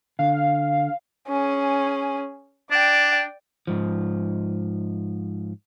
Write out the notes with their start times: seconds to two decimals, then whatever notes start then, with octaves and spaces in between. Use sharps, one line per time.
0.19 D3 F5
1.28 C#4 G#4
2.71 D4 D5 G5
3.67 G#2 F3